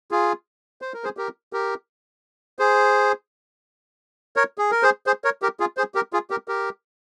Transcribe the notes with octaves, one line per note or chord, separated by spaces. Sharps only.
F4 G#4
C5
A#4
G#4 C5
G4 A#4
G4 A#4
G#4 C5
A#4 C#5
G#4
A#4
G#4 C5
G#4 C5
A#4 C#5
G4 A#4
F4 G#4
G#4 C5
G4 A#4
F4 G#4
G4 A#4
G4 A#4